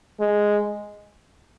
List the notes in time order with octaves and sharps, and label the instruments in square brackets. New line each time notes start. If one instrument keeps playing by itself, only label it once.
[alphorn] G#3